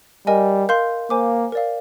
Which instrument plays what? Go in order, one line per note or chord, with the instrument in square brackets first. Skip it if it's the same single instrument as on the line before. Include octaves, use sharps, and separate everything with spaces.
[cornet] G3 [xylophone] A#4 D#5 G#5
[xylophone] A#4 F5 C6 G6
[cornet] A#3 [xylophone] C5 F5 G#5 D6
[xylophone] A#4 D5 F5